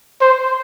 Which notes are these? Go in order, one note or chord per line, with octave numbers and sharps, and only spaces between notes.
C5